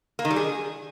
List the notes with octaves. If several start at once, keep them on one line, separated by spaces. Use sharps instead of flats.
A#3
D#3
G3
G#4